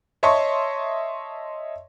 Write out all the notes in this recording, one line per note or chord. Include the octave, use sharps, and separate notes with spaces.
C#5 D#5 E5 A5 C6 C#6